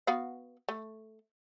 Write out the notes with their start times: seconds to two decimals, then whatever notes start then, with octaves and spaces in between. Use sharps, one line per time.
0.07 B3 F#4 F5
0.69 A3